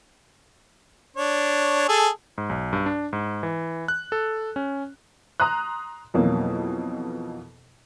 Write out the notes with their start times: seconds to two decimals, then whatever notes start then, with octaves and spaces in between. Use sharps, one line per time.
1.16 D4 C#5
1.88 G#4 A4
2.38 G#2
2.49 B1
2.73 G2
2.86 D4
3.13 G#2
3.43 E3
3.88 F#6
4.12 A4
4.56 C#4
5.40 A#5 C6 D#6 F#6
6.14 F2 B2 E3 F#3 A#3